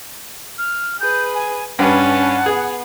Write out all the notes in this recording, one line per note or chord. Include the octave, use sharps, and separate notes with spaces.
F6
G#4 B4 G6
G#5
G2 C#4 B4 F#5 A5
B3 G#4